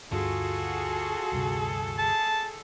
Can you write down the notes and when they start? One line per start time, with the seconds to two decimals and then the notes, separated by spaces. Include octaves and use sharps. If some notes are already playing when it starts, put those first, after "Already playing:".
0.11 D2 G2 D4 F4 F#4 G#4 A4
1.32 D2 G2 C3
1.98 G#4 A5